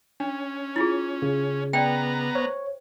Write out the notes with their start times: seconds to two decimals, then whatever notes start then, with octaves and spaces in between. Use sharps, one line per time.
0.20 C#4 D4
0.76 E4 F4 G#4
1.22 C#3
1.73 B3 D5 G5 A#5
2.35 C5 C#5